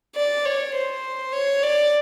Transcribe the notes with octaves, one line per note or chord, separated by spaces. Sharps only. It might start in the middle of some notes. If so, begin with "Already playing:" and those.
D5
C#5
C5
C#5
D5